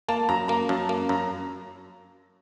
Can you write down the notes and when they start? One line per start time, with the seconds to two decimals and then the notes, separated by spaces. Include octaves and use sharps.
0.08 A#3 A5
0.29 F#2 A#5
0.48 A#3 A#5
0.69 F#2 A5
0.89 A#3
1.09 F#2 A#5